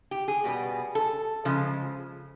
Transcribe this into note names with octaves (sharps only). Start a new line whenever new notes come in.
G4
G#4
B2 G3 B3
A4
C#3 F3 G#3